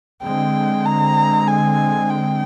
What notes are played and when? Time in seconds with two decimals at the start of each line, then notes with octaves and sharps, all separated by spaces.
0.22 D3 G#3 C4 G5
0.85 A#5
1.48 G#5
2.10 G5